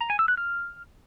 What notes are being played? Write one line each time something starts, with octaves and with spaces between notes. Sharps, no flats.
A#5
G#5
E6
F#6
F6